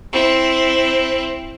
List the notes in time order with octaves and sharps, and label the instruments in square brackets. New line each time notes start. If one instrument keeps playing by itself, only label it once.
[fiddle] C4 E4